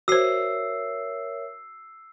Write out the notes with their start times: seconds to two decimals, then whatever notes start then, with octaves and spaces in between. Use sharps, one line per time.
0.08 F#4 A#4 C5 C#5 E5 E6 C7